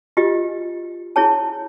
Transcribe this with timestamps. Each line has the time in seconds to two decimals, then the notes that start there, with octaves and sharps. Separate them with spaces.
0.17 F4 G4 D#5
1.16 E4 G#4 C#5 A5